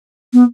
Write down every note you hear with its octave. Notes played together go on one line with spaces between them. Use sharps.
B3